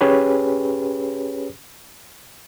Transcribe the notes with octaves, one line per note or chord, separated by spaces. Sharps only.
C#4 G4 G#4 B4 C#5